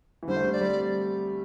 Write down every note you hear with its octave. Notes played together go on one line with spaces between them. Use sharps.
E3
D3 G3 C5
A3
D3 G3
D5
G3 C4